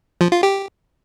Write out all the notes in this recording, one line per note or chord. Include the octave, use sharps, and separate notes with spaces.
F3
F4
G4